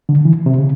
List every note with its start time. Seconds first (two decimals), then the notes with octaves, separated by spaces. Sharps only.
0.09 D3
0.25 E3
0.46 C3
0.58 C#3